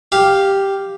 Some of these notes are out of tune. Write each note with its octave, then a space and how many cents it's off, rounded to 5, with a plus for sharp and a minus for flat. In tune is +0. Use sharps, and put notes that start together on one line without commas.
G4 +0 F5 +0